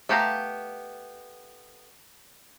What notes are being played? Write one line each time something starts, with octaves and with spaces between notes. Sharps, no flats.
A3 B3 G4 F5 A#5